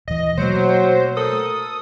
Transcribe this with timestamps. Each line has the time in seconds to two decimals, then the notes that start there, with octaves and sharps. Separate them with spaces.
0.08 D#1 E3 D#5
0.37 B2 F#3 A3 A#3 C5
1.17 A4 A#4 D#6